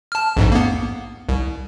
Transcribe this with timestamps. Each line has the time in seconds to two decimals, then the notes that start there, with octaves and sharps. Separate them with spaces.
0.12 A5 F6
0.37 A#1 F2 G#2
0.52 A#3 B3
1.29 C2